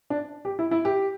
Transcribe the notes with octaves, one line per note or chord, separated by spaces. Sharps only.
D4
G4
E4
E4
G4